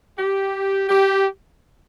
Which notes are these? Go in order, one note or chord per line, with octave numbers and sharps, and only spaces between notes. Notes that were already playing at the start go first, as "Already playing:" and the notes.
G4
G4